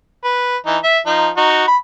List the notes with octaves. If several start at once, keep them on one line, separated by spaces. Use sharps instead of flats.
B4
E3 D#4
E5
F3 D#4
D#4 F#4
B5